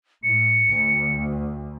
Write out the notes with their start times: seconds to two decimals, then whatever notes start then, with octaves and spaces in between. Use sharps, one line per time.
0.23 A2 C#7
0.67 D2